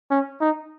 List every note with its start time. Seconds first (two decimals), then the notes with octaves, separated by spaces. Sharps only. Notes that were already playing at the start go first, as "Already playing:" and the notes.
0.10 C#4
0.41 D#4